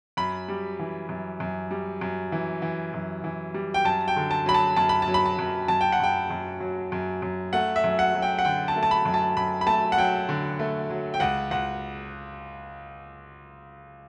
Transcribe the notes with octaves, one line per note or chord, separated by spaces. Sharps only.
F#2 B5
G3
E3
F#2
F#2
G3
F#2
E3
E3
F#2
E3
G3
G5
F#2 A5
G5
D3
A5
F#3 B5
A5
F#2 A5
B5
A5
F#3
B5
A5
F#2
F#2 A5
G5
F#5
F#2 G5
F#2
F#3
F#2
F#2
A3 F#5
E5
F#2
F#5
F#3
G5
F#5
D3 G5
A5
A3
A5
B5
F#2
A5
F#2 B5
B5
A3 A5
F#5
F#3 G5
D3
A3
F#3
G5
C#2 F#5
C#2 F#5